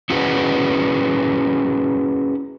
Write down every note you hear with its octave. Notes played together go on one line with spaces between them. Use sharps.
C#4 E4 F#4 G#4 B4